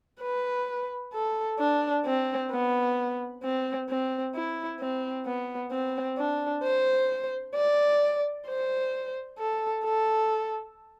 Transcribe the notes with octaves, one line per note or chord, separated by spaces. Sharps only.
B4
A4
D4
C4
B3
C4
C4
E4
C4
B3
C4
D4
C5
D5
C5
A4
A4